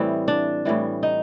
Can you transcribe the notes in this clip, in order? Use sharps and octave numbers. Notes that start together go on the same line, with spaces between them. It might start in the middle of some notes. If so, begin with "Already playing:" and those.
Already playing: A2 E3 G3 C4
D4
A2 E3 G3
D#4